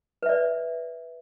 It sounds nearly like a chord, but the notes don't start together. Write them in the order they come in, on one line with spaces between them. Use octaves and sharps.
B4 E5 D5